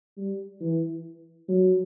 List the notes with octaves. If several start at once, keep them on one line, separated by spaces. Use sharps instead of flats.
G3
E3
F#3